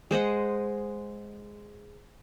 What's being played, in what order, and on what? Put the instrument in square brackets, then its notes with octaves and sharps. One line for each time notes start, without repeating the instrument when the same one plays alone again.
[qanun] G#3 C5 D#5 F#5